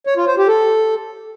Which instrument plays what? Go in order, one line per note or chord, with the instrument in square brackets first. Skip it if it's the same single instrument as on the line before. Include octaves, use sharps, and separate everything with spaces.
[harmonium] C#5
F4
C5
G4
A4